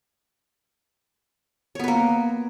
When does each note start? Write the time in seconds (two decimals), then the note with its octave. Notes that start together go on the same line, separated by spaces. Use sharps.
1.75 C#5
1.79 B3
1.84 B4
1.88 A#3